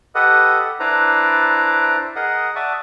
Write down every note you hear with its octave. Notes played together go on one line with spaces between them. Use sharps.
G4 A4 B4 D#5 F#5
D4 E4 B4 C5 D5 A#5
G#4 A#4 D#5 F#5
D5 E5 F#5 A5 C#6 D#6